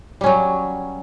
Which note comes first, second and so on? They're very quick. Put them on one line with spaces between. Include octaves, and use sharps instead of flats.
G3 C#4 F#3